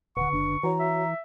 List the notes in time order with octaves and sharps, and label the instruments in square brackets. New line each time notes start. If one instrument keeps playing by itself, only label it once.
[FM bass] D#1 [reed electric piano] D3 B4 [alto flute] F#5 [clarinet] C#6
[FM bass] F#1 [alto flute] D4
[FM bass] E3 [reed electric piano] F#4 C#5 [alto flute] A#5
[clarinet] E5